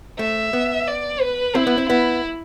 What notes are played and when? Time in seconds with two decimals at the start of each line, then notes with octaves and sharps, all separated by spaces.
0.19 A3 E5
0.53 B3
0.88 D5
1.21 B4
1.55 C4 E4
1.67 B3
1.78 C4
1.89 B3 E4